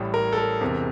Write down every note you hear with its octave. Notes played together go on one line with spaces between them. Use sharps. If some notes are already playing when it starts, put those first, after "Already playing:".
Already playing: A1 A2 G3
A#4
A4
A#4
E1 E2 C3